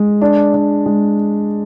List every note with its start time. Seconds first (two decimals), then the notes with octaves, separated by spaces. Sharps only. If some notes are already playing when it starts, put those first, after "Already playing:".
Already playing: G#3
0.22 D4
0.54 D4
0.86 G#3